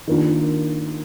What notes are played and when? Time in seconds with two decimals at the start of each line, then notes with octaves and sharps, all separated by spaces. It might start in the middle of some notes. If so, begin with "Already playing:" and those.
0.07 D#3 A#3 D4 F4